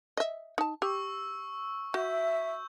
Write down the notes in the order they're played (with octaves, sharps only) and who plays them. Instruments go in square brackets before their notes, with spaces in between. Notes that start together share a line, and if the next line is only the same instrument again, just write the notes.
[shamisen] D#5 E5
D#4 A5
[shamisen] G4 [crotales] C#6 E6
[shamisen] F#4 [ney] E5 [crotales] G6